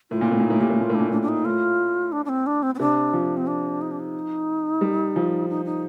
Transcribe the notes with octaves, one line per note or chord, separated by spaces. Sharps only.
A2 F4
A#2
A2 C4
A#2 D#4
A2
A#2 G4
A2
A#2 F4
A2
D4
A#2
A2 D4
D4
D#4
A2 F4
D4
D4
C4
D4
C4
C4
C3 D4
F3
C4
D4
D#4
D4
D#4
G3
F3
D#4
D#4